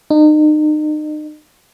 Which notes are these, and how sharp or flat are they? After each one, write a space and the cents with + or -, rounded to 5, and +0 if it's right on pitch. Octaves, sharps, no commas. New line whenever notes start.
D#4 -35